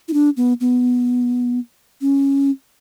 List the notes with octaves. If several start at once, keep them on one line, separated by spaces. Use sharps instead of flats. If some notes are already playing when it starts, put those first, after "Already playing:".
E4
D4
B3
B3
C#4